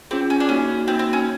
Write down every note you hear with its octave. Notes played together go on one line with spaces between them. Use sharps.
C4 C#4 F4 G#4
C#4
D4
A#3 C#4 D#4 F#4
A#3 C4 D#4 F#4
C4
C#4